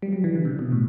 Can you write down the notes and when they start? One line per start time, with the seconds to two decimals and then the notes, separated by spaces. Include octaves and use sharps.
0.02 G3
0.13 F#3
0.24 E3
0.36 D3
0.45 C3
0.59 B2
0.72 A2